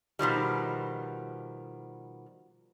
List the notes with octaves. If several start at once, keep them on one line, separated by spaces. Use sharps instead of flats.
B2 D#3 F3 G3